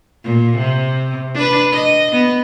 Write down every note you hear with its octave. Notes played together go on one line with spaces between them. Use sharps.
A#2
C3
D4 B4
D#5
B3